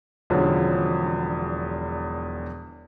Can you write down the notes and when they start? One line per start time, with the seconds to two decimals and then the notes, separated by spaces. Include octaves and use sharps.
0.30 E1 E2 D3 F3 F#3 C#4